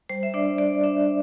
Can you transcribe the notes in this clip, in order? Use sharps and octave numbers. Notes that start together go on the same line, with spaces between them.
G3 C5
E5
D4 D5
D4 D5
D4 E5